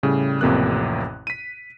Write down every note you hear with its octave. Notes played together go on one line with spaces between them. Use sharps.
A2 C#3 G3
A1 F2 C3 A#3 F#6
B6 D#7